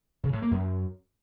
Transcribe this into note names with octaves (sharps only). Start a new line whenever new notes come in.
C#3
A2
A#3
F#2